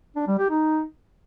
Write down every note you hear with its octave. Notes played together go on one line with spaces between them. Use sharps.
D4
G3
G4
D#4